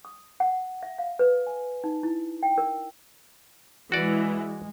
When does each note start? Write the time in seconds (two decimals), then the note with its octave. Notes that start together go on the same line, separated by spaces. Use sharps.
0.05 D#6
0.40 F#5
0.83 E5
0.98 F5
1.19 B4
1.47 G#5
1.84 D#4
2.03 E4
2.43 G5
2.58 A#4
3.92 E3 G#3 F#4 D5